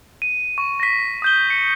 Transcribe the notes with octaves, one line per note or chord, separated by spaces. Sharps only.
D#7
C#6
A#6 B6
D#6 G6 G7
C#7